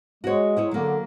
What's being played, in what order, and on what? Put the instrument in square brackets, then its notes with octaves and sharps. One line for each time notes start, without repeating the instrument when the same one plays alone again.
[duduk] G#3 [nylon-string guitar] F#4 C#5
[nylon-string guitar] E4 G#4 C#5
[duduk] D3 [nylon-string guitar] F#3 A#3